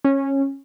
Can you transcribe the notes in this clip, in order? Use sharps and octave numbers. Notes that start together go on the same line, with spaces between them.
C#4